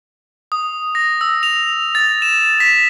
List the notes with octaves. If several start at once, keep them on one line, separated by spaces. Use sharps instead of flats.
D#6
A#6
E6
F7
A6
E7
B6